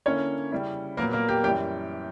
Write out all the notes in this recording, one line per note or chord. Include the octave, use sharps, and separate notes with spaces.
D3 A#3 C#4 E4 C#5
C#3 G3 C#4 E4
A#2 F#3 A#3 B3 A#4
A#3 A#4
G4
F#2 E3 G3 G4